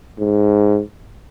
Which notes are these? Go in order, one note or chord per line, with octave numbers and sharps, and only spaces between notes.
G#2